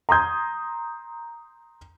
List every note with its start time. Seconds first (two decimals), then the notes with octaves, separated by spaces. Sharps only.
0.09 A#5 C6 D#6 G6 G#6